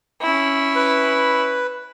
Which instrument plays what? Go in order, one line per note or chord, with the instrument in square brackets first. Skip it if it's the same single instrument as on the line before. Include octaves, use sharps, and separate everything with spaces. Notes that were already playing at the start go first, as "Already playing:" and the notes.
[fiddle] C#4 E4
[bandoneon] B4